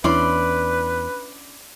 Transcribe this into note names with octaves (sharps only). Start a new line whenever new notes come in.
E2 C#4 D4 E4 B4 D5 B5 C6